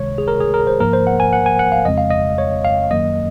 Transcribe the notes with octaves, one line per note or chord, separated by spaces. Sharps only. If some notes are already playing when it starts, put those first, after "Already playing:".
Already playing: C#2 C3 D#3 G#3 C#5
G#4
A#4
G#4
A#4
C5
G#2 F3 A#3 A#4
C5
F#5
G#5
F#5
G#5
F#5
F5
F2 C#3 G#3 C4 D#5
F5
D#5
C#5
F5
F#2 D#3 F#3 A#3 D#5